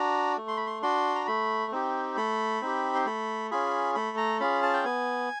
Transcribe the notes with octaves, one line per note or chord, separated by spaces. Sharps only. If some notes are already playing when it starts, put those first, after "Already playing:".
Already playing: D4 F#4 A#5
A3
C6
B5
C6
D4 F#4 C6
A#5
A3 B5
C4 D#4 G4
A3 B5
C4 D#4 G4
C6
A3 B5
C#4 F4 G#4 B5
A3 B5
A#5
C#4 F4 G#4 B5
A5
G5
B3 G#5